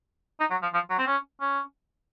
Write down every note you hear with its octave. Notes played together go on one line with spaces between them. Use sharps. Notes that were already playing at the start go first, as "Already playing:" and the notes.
D#4
F#3
F3
F3
F#3
C4
C#4
C#4